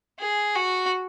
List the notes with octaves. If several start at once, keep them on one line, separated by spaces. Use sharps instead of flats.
G#4
F#4